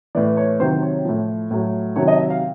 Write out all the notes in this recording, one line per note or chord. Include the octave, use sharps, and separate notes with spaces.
A2 E3 D5
C#5
C3 D#3 F#3 C5
C#5
A2 F3
A2 F#3
C3 D#3 F#3 C#5
D#5
E5
F5